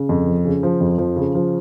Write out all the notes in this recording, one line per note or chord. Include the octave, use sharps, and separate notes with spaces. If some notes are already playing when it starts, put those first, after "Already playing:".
Already playing: C#3
F2
F3
C#3
F3
F2
F3
C#3
F3